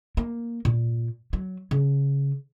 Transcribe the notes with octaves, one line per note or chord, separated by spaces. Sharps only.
A#3
A#2
F#3
C#3